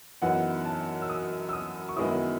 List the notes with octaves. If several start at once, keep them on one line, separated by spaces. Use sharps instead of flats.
F#2 E3 B3 D#4 F#5
A5
E6
D#6
E6
D#6
C#6
F#2 D#3 G#3 B3 E4 D#6